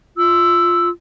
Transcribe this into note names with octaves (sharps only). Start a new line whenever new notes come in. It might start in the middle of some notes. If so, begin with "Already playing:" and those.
F4 E6